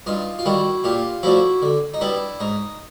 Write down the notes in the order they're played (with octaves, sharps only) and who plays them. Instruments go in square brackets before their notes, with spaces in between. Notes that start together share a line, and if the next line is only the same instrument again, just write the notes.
[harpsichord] G2 D#4 F4
F4
D#3 G3 E4 F#4
A#2 F4 G4
F3 A3 D4 E4 F#4
D3
D#4
G3 B3 D4 E4
G#2 D#4